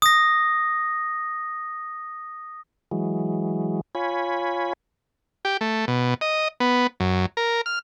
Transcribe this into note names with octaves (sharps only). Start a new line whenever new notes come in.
D#6 A#6
E3 F#3 G#3
F4 C#5 G#5 B5
G4
A3
B2
D#5
B3
F#2
A#4
F6